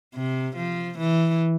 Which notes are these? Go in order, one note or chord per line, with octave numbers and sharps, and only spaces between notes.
C3
F3
E3